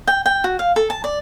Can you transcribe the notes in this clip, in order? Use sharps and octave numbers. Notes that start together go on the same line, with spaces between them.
G5
G5
F#4
F5
A4
A5
D5